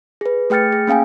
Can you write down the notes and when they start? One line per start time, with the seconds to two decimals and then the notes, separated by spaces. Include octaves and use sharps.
0.21 G#4 B4
0.50 A3 G#4 G5 F6 A6 C#7
0.72 G#4
0.87 A#3 C#4 F5 G5 G#5